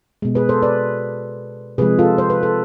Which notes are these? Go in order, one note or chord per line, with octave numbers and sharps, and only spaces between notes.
B2 G#3
G#4 B4
A4 C5
B4 D5
C3 F3 G#3 G#4 B4
F4 A4
C5
B4
A4